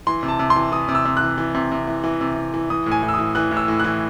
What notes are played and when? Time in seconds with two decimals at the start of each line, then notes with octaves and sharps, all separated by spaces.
0.07 E3 C6
0.23 C3
0.28 A5
0.39 C3
0.50 C6
0.56 E3
0.72 E3 D#6
0.88 C3
0.95 E6
1.05 C3
1.17 E3 F#6
1.38 E3
1.55 C3
1.72 C3
1.88 E3
2.04 E3
2.21 C3
2.36 C3
2.54 E3
2.70 E3 D#6
2.86 A2
2.91 G#5
3.03 A2
3.09 E6
3.14 D#6
3.19 E3
3.35 E3 F#6
3.51 A2
3.57 E6
3.68 A2
3.80 E3 F#6